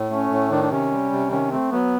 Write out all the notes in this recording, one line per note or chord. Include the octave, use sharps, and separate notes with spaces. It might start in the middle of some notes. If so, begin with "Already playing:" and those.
Already playing: A2
A3 C#4
A2
D#3 D4
D4
C3 C#4
G3
C3
D#3 C#4
A3 C4
F#3 B3